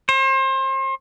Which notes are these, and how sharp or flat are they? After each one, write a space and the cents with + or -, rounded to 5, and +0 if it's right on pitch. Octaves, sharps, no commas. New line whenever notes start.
C5 +35